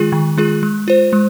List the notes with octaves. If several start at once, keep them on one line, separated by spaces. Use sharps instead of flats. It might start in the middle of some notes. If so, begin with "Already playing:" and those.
Already playing: D#3 G#3 F4 G#4
D#3
G#3 F4 G#4
G#3
F4 C5
G#3